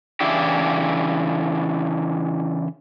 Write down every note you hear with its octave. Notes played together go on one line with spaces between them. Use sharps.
C#3 E3 D4 E4 G4